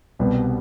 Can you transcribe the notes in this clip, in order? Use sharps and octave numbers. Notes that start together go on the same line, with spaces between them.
C2 B2 G3 B3